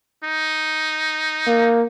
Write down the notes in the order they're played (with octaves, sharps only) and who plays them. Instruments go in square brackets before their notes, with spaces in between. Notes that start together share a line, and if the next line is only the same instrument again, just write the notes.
[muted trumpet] D#4
[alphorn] A#3